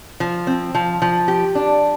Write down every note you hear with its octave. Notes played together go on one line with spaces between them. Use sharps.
F3
C4
F3
F3
G4
D4